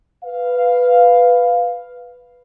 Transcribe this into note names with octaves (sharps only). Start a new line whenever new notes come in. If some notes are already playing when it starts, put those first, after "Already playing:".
B4 F5